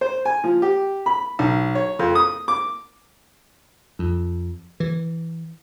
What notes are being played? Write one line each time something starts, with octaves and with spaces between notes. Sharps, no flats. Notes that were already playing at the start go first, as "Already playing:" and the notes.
C5
G#5
F3
G4
B5
B1
C#5
F2
D#6
D6
F2
E3